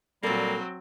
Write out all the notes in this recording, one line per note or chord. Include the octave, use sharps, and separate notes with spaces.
A#2 F#3 G3 A#3 C4 A4